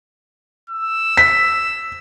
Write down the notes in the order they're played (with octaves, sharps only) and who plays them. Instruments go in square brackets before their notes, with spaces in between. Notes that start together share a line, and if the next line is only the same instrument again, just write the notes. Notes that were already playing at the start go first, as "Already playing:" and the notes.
[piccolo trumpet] E6
[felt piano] B6